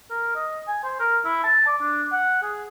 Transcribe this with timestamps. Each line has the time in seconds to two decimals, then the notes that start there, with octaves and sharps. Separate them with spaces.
0.10 A#4
0.36 D#5
0.68 G#5
0.84 C5
1.00 A#4
1.25 E4
1.44 A5
1.67 D5
1.81 D4
2.12 F#5
2.42 G#4